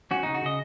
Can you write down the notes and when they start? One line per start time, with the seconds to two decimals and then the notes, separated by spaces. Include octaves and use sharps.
0.11 C#4 F#4
0.23 C#3 D#4
0.34 F#4
0.42 C#3 D#5